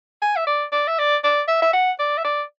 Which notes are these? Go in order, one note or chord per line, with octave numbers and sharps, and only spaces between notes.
G#5
E5
D5
D5
E5
D5
D5
E5
E5
F#5
D5
E5
D5